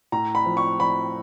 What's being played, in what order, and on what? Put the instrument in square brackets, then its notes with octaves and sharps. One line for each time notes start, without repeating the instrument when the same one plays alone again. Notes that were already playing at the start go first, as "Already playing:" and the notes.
[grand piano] A2 A#5
B5
F3
C#6
F3 B5